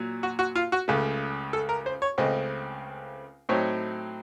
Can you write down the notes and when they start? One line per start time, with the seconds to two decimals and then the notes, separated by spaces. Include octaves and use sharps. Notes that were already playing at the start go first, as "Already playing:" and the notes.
Already playing: A#2 F#3
0.23 F#4
0.39 F#4
0.55 F4
0.72 F#4
0.88 C#2 C#3 A3
1.53 A4
1.69 A#4
1.86 C5
2.02 C#5
2.18 C#2 C#3 A3 C4 D#5
3.49 A2 F#3 C4 D#4 C#5